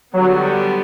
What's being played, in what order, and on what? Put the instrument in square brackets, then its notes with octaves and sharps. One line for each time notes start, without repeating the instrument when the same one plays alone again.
[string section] D3 G3 B3 [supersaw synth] F#3